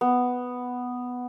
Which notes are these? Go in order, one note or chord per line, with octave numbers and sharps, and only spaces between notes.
B3